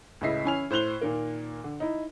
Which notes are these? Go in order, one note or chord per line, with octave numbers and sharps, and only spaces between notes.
C#2 A2 C#3 D#5 E5 C7
E3 C#4 E4 G#5 F6 F7
A2 C5 F#6 F7 G7
A#2 D#3 A#3
D3
D#4 E4